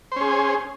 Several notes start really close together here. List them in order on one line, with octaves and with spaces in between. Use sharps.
C5 C#4 G#4